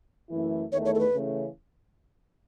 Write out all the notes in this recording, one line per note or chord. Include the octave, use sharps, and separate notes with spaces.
F#2 E3 A3 E4
E2 D#3 A3 E4 C#5
C#5
A4
B4
C#3 E3 A3 C#4